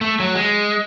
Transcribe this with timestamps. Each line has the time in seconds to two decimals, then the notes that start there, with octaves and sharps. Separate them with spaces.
0.01 A3
0.20 F#3
0.35 G#3